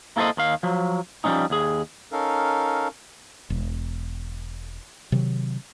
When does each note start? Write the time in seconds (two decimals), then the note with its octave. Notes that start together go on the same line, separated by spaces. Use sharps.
0.17 A#3 E4 A4 B4 C5 D#5
0.37 D#2 D#3 F5
0.63 F3 F#3
1.24 F3 G3 G#3 C#4 D#4
1.50 D#2 G#4
2.12 C#4 D#4 A4 A#4 F5
3.50 E1
5.12 C3 D#3 F#3